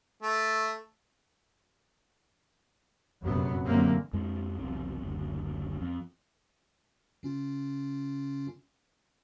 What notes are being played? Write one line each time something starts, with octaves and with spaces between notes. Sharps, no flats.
A3
F1 A#1 F#2 C3 F#3 B3
F1 F#2 D3 A3 A#3 C4
F2 G#3
E1 B1 C3
F#1 D2
F2
C#3 C#4 F4